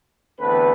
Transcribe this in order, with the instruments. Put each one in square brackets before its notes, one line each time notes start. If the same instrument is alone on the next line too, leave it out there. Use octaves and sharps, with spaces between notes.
[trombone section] E2 D3 A3 C4 B4